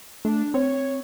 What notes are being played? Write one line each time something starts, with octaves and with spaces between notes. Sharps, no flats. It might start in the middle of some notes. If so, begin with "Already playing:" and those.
A3 D4
C4 C#5